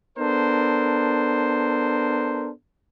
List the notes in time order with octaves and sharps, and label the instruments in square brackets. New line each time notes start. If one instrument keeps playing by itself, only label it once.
[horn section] B3 D4 A4 A#4 C5